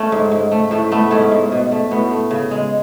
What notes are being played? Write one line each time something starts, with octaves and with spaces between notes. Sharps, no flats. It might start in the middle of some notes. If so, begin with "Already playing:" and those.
Already playing: A3 C#4
G#2
G#2
A3
A2 A3
A3 B3
G#2 A3 C#4
G#2
B2
A3
A2 B3
A3
C#3
G#3